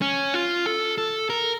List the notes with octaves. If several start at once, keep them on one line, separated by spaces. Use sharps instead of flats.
C#4
F4
A4
A4
A#4